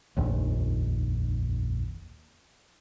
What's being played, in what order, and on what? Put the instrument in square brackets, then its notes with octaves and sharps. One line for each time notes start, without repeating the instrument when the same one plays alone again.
[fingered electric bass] F1 A#1 D#2